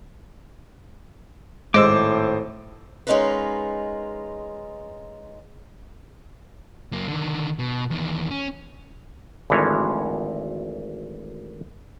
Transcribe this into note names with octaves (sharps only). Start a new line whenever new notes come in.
G#1 A2 G#3 C5 D6 E6
G#3 C#4 D#4 F4 A#4 B4
F#2 A#3
D3 D#3
B2
E2 D#3
C#4
G#1 D2 E3 F3 C#5